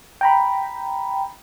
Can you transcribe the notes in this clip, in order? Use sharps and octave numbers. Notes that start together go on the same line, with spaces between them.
G5 A#5 B5